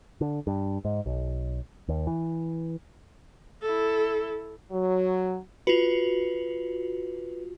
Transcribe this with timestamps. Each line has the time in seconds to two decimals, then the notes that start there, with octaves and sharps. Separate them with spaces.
0.21 D3
0.47 G2
0.85 G#2
1.06 B1
1.88 D#2
2.07 E3
3.62 E4 A4
4.72 F#3
5.67 F4 F#4 B4